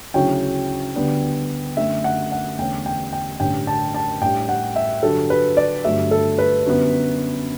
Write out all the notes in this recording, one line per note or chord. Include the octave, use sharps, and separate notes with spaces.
D2 C#3 F#3 C#4 E4 G5
D2 D3 G3 B3 D4
F#2 D3 A3 E5
F#5
F#5
E2 D3 A3 C#4 G5
G5
G5
A1 G2 D3 A3 C#4 G5
A5
A5
A2 G3 D4 G5
F#5
E5
G2 D3 F#3 A4
B4
D5
G1 G2 D3 F#3 A3 E5
A4
B4
F#2 D3 G3 B3